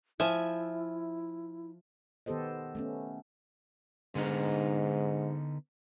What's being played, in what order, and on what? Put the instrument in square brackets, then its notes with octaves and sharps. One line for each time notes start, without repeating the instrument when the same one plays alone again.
[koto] F3 G#5 [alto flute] E4 [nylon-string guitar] E5
[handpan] D#3 B3 G4 A4 C5 D#5
A3 B3 C#4
[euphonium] G#2 [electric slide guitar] D3 B3 D#4